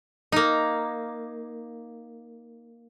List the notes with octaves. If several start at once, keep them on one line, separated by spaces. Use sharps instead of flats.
A#3 D#4